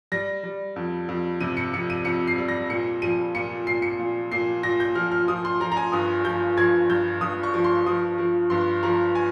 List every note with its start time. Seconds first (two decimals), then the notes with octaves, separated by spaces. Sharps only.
0.12 G3 A#6
0.44 G3
0.76 F2
1.09 F2
1.40 C3 D#7
1.57 C#7
1.74 F2 C#7
1.90 D#7
2.05 F2 C#7
2.27 C7
2.38 G3
2.49 A#6
2.70 A#2 C#7
3.02 F3 D#7
3.35 A#2 C#7
3.67 A#2 C7
3.82 C#7
3.99 A#2
4.32 A#2 C7
4.63 A#2 A#6
4.80 G6
4.95 F3 F6
5.12 F6
5.28 F3 D#6
5.45 C6
5.60 F3 A#5
5.72 A#5
5.77 G#5
5.92 G2 D#6
6.24 F3 G6
6.57 F3 G#6
6.89 G2 G6
7.21 G2 D#6
7.43 C#6
7.54 F3
7.64 C6
7.86 F3 D#6
8.18 F3
8.50 G2 C6
8.83 F3 A#5
9.15 G#5